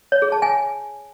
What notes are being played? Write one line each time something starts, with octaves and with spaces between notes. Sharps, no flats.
C#5
G#4
A5
G#5